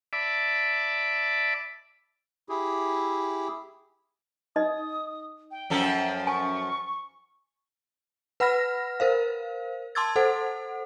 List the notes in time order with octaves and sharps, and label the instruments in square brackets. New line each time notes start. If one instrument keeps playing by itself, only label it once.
[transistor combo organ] D5 E5 A5 B5 D6
[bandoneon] E4 G4 G#4
[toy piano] D#4 D#5 [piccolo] D#6
[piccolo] G5
[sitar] F#2 F3 A4
[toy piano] G#5 [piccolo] C#6
[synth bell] B4 F#5 B5 F6 A#6
A#4 C5 F5
A5 C6 D6 E6 G#6 A6
A4 C5 F#5